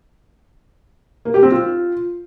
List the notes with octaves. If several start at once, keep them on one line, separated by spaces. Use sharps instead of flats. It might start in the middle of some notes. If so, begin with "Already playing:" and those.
A#3
G4
C4
F4